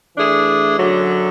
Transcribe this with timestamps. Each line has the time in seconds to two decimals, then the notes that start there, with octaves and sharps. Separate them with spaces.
0.16 E3 A3 D4 G#4
0.78 F#2 D3 F#3